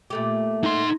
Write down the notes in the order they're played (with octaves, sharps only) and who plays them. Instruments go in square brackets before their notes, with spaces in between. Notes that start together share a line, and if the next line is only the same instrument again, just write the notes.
[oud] A#2 A3 G4
[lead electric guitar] D#4 C6